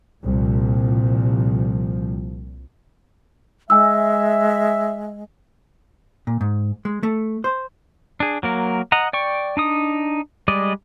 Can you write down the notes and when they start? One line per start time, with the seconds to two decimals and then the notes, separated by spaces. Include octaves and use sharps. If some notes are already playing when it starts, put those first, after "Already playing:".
0.23 C2 A#2 F3
3.70 G#3 E5 G#5 E6
6.27 A#2
6.41 G#2
6.85 G#3
7.03 A3
7.44 C5
8.20 D4 G#4
8.43 F#3 A#3 A#4
8.92 D#5 F#5 A#5
9.13 D5 G5 C#6
9.57 D4 D#4 D#6
10.48 G3 G#3 D5 D#5